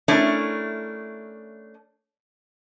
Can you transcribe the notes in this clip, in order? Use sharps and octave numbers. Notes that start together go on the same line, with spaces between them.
A3 C#4 D4 E4 A#4